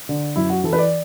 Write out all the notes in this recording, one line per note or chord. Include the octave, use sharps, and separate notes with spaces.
D3
F#2 E4
F#4
E3 A4
B4
D5